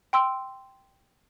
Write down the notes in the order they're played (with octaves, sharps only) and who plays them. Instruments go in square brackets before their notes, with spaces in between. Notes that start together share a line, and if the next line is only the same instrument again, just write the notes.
[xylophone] G5 C6 E6 D7